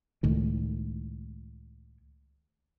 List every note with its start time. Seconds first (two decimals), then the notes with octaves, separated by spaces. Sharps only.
0.23 C#2 A2 D#3